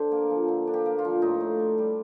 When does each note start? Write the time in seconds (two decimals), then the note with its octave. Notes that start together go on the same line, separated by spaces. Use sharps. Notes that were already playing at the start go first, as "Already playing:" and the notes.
Already playing: D3 D4 C5
0.12 A#3
0.30 F3
0.48 D3
0.67 D4
0.74 G4
0.86 A#3
0.99 F4
1.05 F3
1.22 A2 D#4
1.40 A2
1.59 D4
1.78 G3